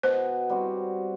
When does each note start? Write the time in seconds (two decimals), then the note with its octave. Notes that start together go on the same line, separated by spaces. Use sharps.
0.03 B2 C5
0.49 G3 C4 F#4